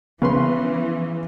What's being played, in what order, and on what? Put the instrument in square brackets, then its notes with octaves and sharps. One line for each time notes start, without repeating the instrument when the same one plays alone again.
[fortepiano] C#3 B4 C6 [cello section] E3 [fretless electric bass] B3